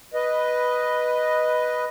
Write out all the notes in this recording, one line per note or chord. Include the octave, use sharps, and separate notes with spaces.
B4 D#5